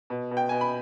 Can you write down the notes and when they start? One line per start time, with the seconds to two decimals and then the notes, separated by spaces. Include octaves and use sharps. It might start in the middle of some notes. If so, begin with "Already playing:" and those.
0.10 B2
0.31 B2
0.37 G5
0.49 B2 G#5
0.61 B5